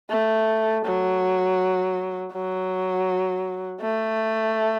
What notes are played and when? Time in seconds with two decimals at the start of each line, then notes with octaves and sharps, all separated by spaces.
0.10 A3
0.85 F#3
2.33 F#3
3.82 A3